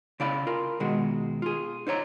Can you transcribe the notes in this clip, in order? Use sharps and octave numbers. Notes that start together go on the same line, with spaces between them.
C#3 E4 D5 F5 B5
F4 A#4
B2 D#3 G#3 F#4
F4 G#4
D#4 C5 C#5 A#5